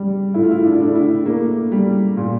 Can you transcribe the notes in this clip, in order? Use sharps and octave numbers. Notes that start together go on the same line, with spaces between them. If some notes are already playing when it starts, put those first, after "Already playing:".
Already playing: G3
A2 E4
F4
E4
D4
E4
A2 D4
E4
A#3
G3
A#2